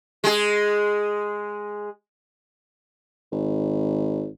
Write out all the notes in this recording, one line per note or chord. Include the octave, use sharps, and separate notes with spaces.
G#3 G#4
G#1